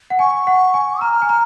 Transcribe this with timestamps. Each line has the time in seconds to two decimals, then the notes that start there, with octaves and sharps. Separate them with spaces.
0.10 F#5
0.19 G#5 C#6
0.47 F#5
0.74 G#5
1.01 A#5 F6
1.22 G#5
1.29 A#5